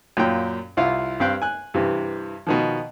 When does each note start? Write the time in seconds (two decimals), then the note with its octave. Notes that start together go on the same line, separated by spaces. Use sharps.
0.17 F#2 A#2 C#4 F4 G5
0.77 C2 E4 F4 F5 F#5
1.20 G2 C4 F5 G5 F#6
1.42 G#5 F#6
1.74 G2 C3 E3
2.47 B2 D#3 F3